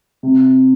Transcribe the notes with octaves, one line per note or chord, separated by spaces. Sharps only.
C3